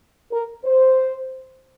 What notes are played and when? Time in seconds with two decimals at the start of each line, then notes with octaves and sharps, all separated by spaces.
0.31 A#4
0.65 C5